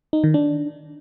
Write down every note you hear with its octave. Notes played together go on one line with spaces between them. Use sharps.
D#4
D#3
D4